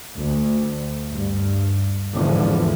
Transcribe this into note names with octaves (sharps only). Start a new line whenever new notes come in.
D2
G2
G#1 E2 G#2 D3 E3 F3